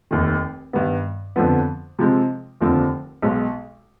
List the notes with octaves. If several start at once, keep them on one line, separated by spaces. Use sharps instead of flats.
F1 D#2 D#3
G2 D#3 B3
F2 D3 F3 B3
C3 F3 G#3 C4
F1 D#2 D3 F3 C4
B1 B2 G#3